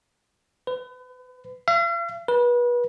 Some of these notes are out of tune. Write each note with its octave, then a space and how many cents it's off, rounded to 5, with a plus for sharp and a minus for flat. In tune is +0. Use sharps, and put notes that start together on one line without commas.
B4 +35
F5 -45
B4 -30